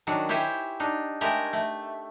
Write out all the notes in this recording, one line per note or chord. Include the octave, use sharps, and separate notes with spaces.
D#3 F#3 D4 F#4
E4 G4 C5 C#5 G#5
D4 D#4
G#3 A3 G4 A#4 G#5
A3